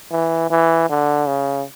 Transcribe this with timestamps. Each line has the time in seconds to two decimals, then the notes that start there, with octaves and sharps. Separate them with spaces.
0.12 E3
0.51 E3
0.90 D3
1.28 C#3